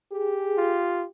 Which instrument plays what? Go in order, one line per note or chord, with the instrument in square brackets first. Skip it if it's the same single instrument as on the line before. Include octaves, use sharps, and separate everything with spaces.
[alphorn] G4 [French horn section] G#4
[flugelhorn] F4